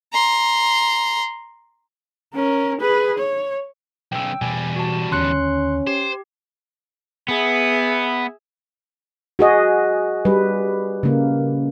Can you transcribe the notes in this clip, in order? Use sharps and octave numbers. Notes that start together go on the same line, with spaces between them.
A#5 C6
C#4 A#4
G#4 B4
C#5
B1 C#3 G5 E6
E2 B2 E3 G3 G#5
F#4 A5
D#2 D3 D#3 C#4 C6 F#6 C#7
G4 C5
B3 G#4 E5
F#4 G#4 D#5
G3 B4
C#3 A#3